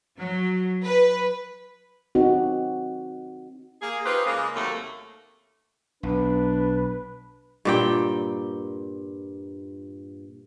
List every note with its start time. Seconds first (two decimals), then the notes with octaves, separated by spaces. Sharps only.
0.18 F#3
0.83 B4
2.15 C4 D#4 F#4
3.82 A#3 G#4
4.05 D#4 F4 G4 G#4 B4 C5
4.26 C#3 G#3 A#3
4.55 D#2 C3 F#3 A3 A#3
6.03 B1 D4 B4
7.65 G2 A#2 G5